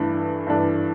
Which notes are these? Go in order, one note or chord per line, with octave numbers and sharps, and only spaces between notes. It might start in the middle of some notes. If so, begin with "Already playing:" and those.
Already playing: G2 E3 A3 D4
G2 E3 A3 D4